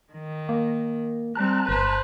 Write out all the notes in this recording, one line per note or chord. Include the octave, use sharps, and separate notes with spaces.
D#3
A#3
G3 C4 A5 A#5 F#6
G1 B4 C5